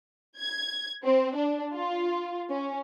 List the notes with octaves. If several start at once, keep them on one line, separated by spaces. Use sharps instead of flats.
G#6
C4
D4
F4
C#4